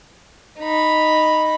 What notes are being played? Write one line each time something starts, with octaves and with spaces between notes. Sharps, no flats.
D#4 B5